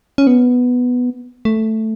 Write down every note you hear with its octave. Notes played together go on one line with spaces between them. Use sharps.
C#4
B3
A3